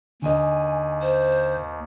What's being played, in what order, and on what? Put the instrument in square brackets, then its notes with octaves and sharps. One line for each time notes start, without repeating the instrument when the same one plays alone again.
[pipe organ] D#2 [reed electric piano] D3 D#5 [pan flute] G#5
[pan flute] C5